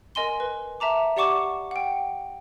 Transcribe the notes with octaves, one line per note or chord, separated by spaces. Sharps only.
A#4 D#5 G#5 C6 G7
B4
E5 A5 A#5 D6
G4 D5 F#5 C#6 D6 E7
F#5 G5